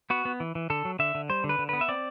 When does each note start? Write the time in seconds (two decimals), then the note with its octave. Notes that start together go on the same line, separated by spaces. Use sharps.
0.10 B3 F#4
0.25 B3
0.40 E3
0.55 E3
0.70 D3 A4
0.85 F#3
0.99 D3 E5
1.15 D3
1.29 G3 C5
1.44 D3
1.49 B4
1.59 D3
1.69 B3 B4
1.81 E5
1.89 C4 D5